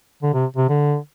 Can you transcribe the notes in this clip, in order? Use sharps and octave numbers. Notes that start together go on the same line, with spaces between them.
D3
C3
C3
D3